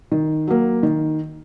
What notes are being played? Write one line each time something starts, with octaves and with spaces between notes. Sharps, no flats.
D#3
F#3 A#3
D#3